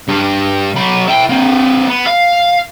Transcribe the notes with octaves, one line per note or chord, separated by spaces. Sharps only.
G2
F#3 B5
E4 G5
A#3 C4
B3
F5